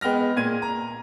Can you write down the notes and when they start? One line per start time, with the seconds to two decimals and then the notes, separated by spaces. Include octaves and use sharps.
0.01 G#3 B3 G5 F6 A#6
0.36 A#2 G#6 D#7
0.62 A#5